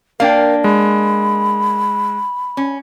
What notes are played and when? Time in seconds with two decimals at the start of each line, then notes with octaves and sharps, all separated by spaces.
0.20 A#3 D4 A#4 F5 G5
0.64 G#3 B5
2.57 C#4